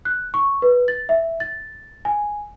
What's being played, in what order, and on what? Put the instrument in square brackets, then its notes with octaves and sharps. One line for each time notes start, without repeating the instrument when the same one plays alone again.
[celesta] F#6
C#6
B4
A6
E5
A6
G#5